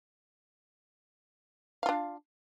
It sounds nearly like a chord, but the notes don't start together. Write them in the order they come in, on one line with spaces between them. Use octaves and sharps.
F5 F4 D4